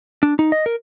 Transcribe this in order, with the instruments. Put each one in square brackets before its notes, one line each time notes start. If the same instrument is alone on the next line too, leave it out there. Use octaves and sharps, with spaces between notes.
[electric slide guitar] D4
D#4
D#5
A#4